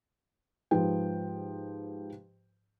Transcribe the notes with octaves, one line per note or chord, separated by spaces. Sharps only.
G#2 F3 G4 B4 G5